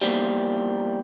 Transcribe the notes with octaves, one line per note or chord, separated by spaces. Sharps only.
E2 A#2 F3 G3